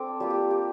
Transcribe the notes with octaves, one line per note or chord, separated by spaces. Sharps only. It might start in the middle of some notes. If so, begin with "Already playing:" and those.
Already playing: C4 D4 A4 D5
G3 A#3 F4 G4
G4
G4